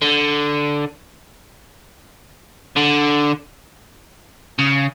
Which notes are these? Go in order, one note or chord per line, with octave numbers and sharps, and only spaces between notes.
D3
D3
C#3